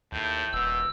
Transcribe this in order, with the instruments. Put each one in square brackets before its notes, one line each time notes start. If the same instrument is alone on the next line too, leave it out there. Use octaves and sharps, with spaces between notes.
[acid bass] D#2 [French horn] A2 [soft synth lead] G6
[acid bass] D#1 [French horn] B2 [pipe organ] E6